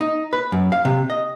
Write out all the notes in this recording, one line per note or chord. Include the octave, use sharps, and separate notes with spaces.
D#4
B4
F#2
F5
C3
D#5